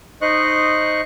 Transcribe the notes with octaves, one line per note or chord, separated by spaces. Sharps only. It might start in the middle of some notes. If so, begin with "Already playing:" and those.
D#4 C5 D#5 C#6 F#6